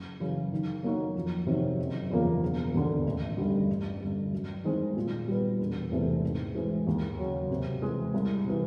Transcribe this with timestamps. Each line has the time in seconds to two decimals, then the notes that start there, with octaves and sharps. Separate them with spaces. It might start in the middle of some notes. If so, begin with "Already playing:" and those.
Already playing: F#1
0.20 F#2 C#3 E3
0.52 D#3
0.83 F#3 A#3 D#4 F#4
1.15 F2
1.47 C3 D#3 F#3
1.78 F#1
2.10 E2 C#3 F3 A#3
2.42 E1
2.74 D#2 D3
3.06 A1
3.37 G2 D3 G3
3.69 G1
4.01 G2 D3
4.33 F#2
4.64 D#3 G#3 C4 E4
4.97 A#2
5.28 G3 B3
5.59 E1
5.91 E2 C3 E3 A3
6.23 G#2
6.55 E3 G#3 C4
6.87 D#2
7.18 C#3 F#3
7.50 C3
7.82 E3 G#3
8.14 C2
8.45 C3 E3